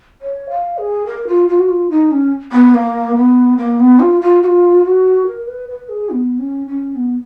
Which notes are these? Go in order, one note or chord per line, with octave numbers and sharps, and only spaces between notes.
C#5
F5
G#4
A#4
F4
F4
F#4
F4
D#4
C#4
B3
A#3
B3
A#3
B3
F4
F4
F#4
F4
F#4
A#4
B4
B4
G#4
B3
C#4
C#4
B3